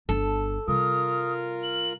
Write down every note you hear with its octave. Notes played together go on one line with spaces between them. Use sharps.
G1 D4 A4
C3 G3 F4 A#4 D#6
F#7